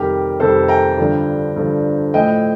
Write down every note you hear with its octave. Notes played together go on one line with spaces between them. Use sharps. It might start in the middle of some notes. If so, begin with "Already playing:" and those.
Already playing: F2 C3 D#3 G3 G4 A#4
F2 C3 D#3 G3 A4 C5
G5 A#5
G2 D3 F3
G2 D3 F3
A2 F3 A3 D#5 G5